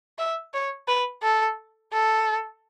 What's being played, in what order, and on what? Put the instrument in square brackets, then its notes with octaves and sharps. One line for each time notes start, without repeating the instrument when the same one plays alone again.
[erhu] E5
C#5
B4
A4
A4